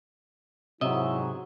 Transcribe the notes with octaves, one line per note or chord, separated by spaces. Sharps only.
G#2 C3 F#3 E4 D#5 E5